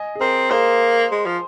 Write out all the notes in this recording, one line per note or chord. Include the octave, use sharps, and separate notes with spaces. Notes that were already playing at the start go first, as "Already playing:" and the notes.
Already playing: D#5 G#5
G#4
C4 A#4
A#3 G#4 C5
G#3
F3